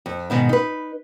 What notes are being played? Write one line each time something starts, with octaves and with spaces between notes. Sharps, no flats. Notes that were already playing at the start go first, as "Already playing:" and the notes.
F2
G#2 B2 D#3
D#4 B4